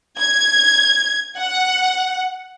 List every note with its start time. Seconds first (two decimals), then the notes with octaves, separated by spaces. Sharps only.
0.20 G#6
1.38 F#5